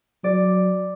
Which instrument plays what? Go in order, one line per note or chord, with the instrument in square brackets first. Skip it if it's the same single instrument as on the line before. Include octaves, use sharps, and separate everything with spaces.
[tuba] F#3 [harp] D5